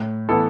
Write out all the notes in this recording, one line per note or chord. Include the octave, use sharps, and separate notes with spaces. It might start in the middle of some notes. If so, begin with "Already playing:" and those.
Already playing: A2
E3 B3 E4 A4